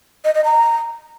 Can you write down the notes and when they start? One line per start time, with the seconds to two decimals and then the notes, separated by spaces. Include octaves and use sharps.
0.25 D#5
0.35 D#5
0.45 A#5